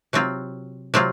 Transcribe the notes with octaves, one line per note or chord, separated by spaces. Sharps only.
C3 F#3 C4 F4
C3 F#3 C4 F4